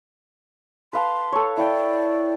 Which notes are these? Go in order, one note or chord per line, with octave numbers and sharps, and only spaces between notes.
B4 F5 A5 C6
A4 C#5
E4 D5 G5